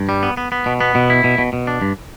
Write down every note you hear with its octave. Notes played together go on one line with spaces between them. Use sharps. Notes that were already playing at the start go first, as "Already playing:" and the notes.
Already playing: G2
G3
B3
B3
B3
B2
B3
B2
E4
B2
B2
B2
D4
G2